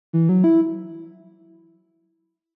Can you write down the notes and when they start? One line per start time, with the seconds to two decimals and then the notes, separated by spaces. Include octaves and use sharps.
0.13 E3
0.29 F#3
0.44 E4